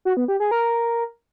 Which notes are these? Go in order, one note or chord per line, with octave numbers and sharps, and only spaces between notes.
F#4
B3
G4
G#4
A#4